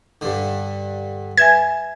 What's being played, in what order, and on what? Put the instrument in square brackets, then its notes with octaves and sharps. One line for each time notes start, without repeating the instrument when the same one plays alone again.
[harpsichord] G2 D3
[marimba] B4 E5 G#5 [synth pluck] G#6